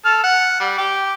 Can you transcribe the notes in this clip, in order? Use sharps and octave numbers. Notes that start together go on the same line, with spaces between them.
A4 F6
F#5
G3
G4 D6